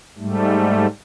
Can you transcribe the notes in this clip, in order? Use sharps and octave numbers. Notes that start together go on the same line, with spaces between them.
G#2 G3 A3